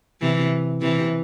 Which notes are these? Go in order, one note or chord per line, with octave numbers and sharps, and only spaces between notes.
C3 E3
C3 E3